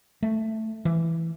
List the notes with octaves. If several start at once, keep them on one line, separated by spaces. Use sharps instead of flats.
A3
E3